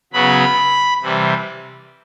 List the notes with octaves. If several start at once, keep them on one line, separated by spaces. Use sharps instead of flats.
C#3 F#3 B3 B5
C3 E3 G3